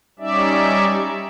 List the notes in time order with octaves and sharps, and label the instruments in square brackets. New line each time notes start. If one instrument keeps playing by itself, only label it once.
[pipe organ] G3 C#4 D#4 D5 E5